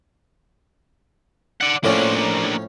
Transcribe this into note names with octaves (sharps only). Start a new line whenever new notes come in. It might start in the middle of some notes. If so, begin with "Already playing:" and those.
D5 F#5
A2 F3 A#3 C#4 D4